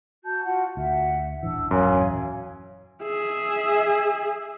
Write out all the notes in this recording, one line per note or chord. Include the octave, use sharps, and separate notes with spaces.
F#4 A5 G6
F4 F#4 F#5
D2 E5 F#5
D#1 A1 E3 D4 E6
F#2 C#5 F5 G#5
G#4 E5